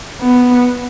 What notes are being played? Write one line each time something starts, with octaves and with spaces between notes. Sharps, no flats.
B3